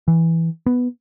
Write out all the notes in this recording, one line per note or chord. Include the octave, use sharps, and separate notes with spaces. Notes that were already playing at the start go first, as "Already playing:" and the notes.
E3
B3